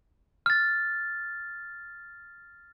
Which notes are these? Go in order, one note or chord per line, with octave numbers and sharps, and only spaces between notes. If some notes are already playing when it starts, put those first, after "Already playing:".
F6 A6